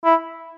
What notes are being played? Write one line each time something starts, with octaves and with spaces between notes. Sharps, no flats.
E4